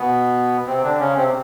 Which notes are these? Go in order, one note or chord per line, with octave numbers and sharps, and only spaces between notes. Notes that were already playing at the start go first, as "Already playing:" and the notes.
Already playing: B2 B3
C3 C4
D3 D4
C#3 C#4
C3 C4